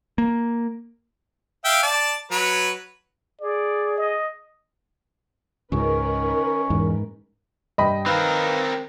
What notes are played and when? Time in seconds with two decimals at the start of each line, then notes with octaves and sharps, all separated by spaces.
0.18 A#3
1.65 E5 F5 G5
1.83 D5 A5
2.31 F#3 B4 C#5
3.41 G#4 D5
3.98 D#5
5.72 C#2 G#2 D#3 C#4 A#4 B4
6.70 E2 G#2
7.78 G2 D#5 G5 B5
8.06 D#3 C4 A#4 B4 F5